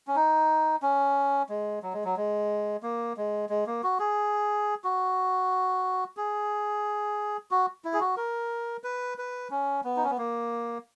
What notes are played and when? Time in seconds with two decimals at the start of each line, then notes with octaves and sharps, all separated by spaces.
0.07 C#4
0.16 D#4
0.82 C#4
1.49 G#3
1.83 F#3
1.93 G#3
2.04 F#3
2.17 G#3
2.83 A#3
3.17 G#3
3.49 G#3
3.67 A#3
3.83 F#4
3.99 G#4
4.84 F#4
6.17 G#4
7.51 F#4
7.84 E4
7.93 G#4
8.00 F#4
8.17 A#4
8.84 B4
9.18 B4
9.51 C#4
9.84 B3
9.96 D#4
10.04 C#4
10.10 B3
10.18 A#3